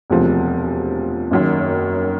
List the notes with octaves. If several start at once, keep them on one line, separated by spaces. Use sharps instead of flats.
E1 D2 C3 F3
F#1 F#2 D#3